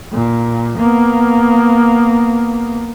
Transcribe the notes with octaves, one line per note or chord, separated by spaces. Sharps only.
A#2
A#3 B3